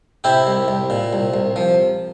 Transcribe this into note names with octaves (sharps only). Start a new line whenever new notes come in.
C3 E4 G4
C2
C2
A#2
C2
C2
F3